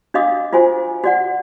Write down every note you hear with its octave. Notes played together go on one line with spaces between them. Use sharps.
D4 F#4 D#5 F5 D6 D#6
F4 F#4 C5 G#5
F#4 D5 F#5